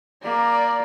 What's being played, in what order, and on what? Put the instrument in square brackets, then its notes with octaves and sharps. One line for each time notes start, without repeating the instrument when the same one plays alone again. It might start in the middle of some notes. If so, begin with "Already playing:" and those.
[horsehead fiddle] A#3 D5